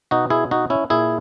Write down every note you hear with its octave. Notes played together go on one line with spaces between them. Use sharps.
B2 D#4 F#4
E4 G#4
D#4 F#4
C#4 E4
A#2 E4 G#4